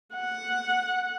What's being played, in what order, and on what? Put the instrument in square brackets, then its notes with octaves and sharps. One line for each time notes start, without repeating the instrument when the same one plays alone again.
[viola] F#5